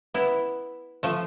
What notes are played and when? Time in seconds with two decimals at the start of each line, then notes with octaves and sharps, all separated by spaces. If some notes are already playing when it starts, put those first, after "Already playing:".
0.14 B3 E4
1.03 F3 A3